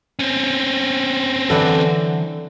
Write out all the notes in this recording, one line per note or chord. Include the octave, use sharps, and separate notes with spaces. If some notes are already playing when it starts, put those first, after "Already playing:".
C4 C#4
D3 E3 F#3 A4 B4 D5